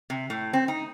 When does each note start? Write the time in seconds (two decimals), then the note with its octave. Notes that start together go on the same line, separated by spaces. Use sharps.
0.10 C3
0.30 A2
0.53 C4
0.68 D#4